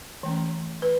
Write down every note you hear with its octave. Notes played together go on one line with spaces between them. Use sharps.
E3 A3 C#4
B4